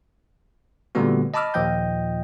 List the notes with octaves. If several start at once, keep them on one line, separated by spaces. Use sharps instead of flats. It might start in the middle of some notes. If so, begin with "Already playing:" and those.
A#2 D3 G3 A3 B3 F#4
D#5 A5 B5 D6 E6 F6
D#2 A#2 F3 D#5 G5 G6